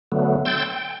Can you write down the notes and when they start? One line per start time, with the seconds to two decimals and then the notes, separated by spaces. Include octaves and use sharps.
0.12 D3 F#3 A3 B3
0.45 G5 C6 E6 G6 A6
0.73 G5